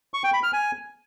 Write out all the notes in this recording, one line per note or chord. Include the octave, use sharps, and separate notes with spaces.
C#6
G5
B5
F6
G#5